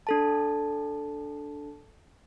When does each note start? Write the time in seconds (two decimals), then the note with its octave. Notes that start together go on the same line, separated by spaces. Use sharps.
0.07 D4 A4 A5